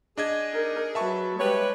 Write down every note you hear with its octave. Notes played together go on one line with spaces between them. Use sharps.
D4 G#4 D#5 G#6
D#4 A#4
F#3 B4 E5 A5 C#6
G3 G#3 G4 B4 C#5